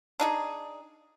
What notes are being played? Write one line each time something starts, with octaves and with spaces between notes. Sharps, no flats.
D4 D#4 G#4